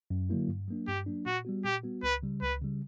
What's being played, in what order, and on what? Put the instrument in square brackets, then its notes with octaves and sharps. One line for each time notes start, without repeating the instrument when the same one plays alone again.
[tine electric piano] F#2
D3 F#3 A#3 E4
G2
F#3 A#3 D4
[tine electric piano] G2 [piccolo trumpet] G4
[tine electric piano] F#3 A#3 D4
[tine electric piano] A#2 [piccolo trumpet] F#4
[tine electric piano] G3 B3 F#4
[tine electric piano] A#2 [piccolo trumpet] G4
[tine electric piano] G3 B3 F#4
[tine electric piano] C#2 [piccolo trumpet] B4
[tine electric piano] C#3 G3
[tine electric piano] C#2 [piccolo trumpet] B4
[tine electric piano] C#3 G3